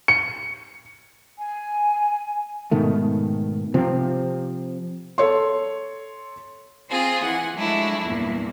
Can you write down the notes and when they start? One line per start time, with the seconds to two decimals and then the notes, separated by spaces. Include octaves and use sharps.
0.08 C#7
1.39 G#5
2.71 G#2 B2 D#3 A3
3.74 C3 F3 C4
5.18 A4 C#5 C6
6.90 C4 F4 G#4 C5
7.23 E3 F#5 G#5
7.55 F3 F#3 G#3 A3 D4 E4
8.04 E2 G2 A#2